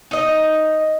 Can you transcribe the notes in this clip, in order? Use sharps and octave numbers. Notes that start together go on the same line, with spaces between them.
D#4 D#5